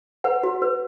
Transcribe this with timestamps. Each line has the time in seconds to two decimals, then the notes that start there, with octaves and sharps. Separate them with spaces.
0.24 B4 F#5
0.43 F#4
0.62 B4